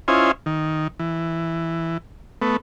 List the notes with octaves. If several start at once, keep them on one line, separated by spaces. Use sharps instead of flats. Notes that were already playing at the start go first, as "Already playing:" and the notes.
C#4 E4 F4 C5 D#5 G#5
D#3
E3
A3 B3